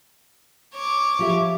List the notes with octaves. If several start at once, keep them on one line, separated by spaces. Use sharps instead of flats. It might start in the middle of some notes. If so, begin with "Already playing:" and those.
C#5 D6
F3 G4 E5